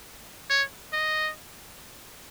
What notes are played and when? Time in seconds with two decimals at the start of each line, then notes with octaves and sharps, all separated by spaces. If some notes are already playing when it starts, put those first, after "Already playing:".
0.50 C#5
0.93 D#5